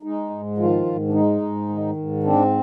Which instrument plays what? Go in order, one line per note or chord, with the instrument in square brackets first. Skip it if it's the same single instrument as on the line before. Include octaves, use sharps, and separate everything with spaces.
[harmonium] G#3 D#4
G#2
D#3 F3 F4
G#2
D4
G#3 D#4
G#2
D#3
G#2
C4 D4